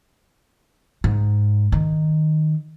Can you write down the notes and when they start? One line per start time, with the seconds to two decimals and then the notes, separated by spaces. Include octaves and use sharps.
1.04 G#2
1.72 D#3